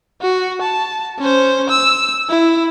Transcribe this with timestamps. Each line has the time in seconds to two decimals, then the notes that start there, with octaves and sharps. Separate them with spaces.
0.22 F#4
0.62 A5
1.18 C#4 C5
1.70 E6
2.30 E4